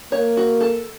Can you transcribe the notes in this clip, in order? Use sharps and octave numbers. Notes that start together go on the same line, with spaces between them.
A#3 C#5
F#4
A4